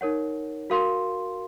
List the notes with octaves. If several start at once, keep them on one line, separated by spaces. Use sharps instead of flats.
D#4 A#4 C#5 F#5
F#4 A#4 F5 C6